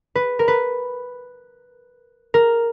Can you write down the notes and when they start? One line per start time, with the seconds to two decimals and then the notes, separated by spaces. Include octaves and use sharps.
0.15 B4
0.39 A#4
0.48 B4
2.34 A#4